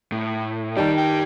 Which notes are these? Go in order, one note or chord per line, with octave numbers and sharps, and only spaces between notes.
A2
D#3 G3 D#4 G4 A5
G5